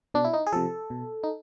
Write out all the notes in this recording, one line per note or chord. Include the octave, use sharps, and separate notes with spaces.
B2 D4
E4
D#4
G#4
C3 F3 A4
B2
D#4